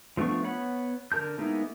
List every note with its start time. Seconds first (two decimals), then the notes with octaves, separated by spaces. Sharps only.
0.17 F3 A3 B3 D4 C#6
0.43 B3 C#5 F#5 B5
1.12 D3 A#4 A5 G6
1.38 G#3 A#3 B3 D#4 E4